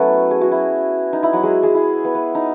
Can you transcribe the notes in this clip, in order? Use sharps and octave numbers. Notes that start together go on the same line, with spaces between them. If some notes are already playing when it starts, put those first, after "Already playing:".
Already playing: F#3 A3 B3 C#4 E4 F#4 A4 B4
G#4
F#4
E4
D#4
E4
F#3 F#4
G#3 G#4
G#3 G#4
E4
B3
B3
D#4